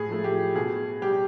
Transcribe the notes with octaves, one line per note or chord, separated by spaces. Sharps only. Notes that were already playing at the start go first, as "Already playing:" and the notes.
Already playing: A2 G#4
F3 A3
G4
B2 G#4
G3 G4